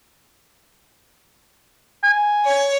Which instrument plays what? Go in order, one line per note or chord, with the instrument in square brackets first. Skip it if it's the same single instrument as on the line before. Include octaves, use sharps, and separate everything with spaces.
[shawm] G#5
[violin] C#5